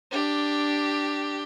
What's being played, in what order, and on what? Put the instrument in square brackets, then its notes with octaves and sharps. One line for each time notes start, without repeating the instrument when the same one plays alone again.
[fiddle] D4 G4